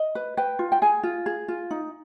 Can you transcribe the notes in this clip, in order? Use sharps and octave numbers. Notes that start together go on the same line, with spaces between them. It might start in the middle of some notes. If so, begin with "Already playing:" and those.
Already playing: D#5
B4
B4 G5
F4
G5
G#4 G#5
F4
G#4
F4
D#4